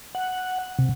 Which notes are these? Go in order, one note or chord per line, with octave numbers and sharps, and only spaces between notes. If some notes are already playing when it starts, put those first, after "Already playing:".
F#5
C3